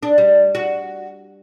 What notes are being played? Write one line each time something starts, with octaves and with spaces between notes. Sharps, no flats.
D4
G3
F#4